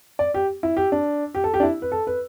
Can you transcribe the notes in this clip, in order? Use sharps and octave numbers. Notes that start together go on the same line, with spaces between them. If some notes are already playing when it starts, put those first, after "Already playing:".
D5
G4
E4
G4
D4
G4
A4
G4
D4
E4
B4
A4
B4